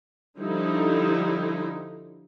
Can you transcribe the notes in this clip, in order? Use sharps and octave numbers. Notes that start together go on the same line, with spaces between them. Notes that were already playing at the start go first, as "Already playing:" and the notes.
D3 F3 G3 D#4 E4